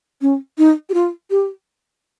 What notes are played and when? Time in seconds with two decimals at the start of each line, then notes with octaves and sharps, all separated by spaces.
0.22 C#4
0.58 D#4
0.89 G4
0.94 F4
1.30 G4